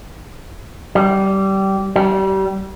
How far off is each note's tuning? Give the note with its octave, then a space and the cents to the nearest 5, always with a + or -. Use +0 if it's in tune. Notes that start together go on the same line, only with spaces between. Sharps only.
G3 -20
G3 -30